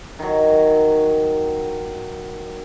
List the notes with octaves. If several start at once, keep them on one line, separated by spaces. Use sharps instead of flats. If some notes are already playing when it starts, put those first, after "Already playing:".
D#3 F#3